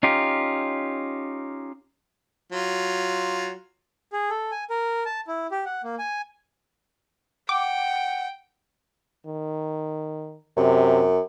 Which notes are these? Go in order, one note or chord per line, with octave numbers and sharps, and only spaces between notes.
C#4 D#4 F4 G4
F#3 F4
G#4
A4
G#5
A#4
A5
E4
G4
F#5
A#3
G#5
F#5 G5 D6
D#3
F#2 C3